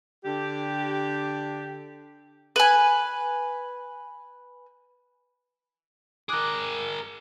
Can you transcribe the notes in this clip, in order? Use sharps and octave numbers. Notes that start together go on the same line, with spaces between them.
D3 D4 G4
B4 G#5
G#4 A#4 D6 F#6